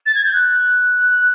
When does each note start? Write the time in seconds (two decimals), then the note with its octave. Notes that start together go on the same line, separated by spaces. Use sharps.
0.06 A6
0.15 G#6
0.25 G6
0.34 F#6